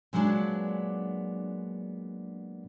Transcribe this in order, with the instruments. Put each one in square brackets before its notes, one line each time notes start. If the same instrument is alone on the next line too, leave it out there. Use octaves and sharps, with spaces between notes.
[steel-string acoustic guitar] A#2 F#3 G#3 B3 C4 D4